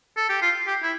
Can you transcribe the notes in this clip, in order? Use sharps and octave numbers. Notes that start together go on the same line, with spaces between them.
A4
G4
F4
G4
E4